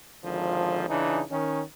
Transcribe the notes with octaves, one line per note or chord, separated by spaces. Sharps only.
G#1 D3 F3
C#3 E3 D4 D#4
D#3 C#4